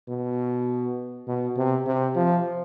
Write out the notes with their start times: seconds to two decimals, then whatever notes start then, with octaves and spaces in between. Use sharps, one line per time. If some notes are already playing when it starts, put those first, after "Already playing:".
0.09 B2
1.27 B2
1.57 C3
1.87 C3
2.16 F3